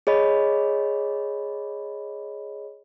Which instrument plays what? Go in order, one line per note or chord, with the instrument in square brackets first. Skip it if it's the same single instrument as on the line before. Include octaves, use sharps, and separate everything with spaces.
[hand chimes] G#4 C#5 D#5 B5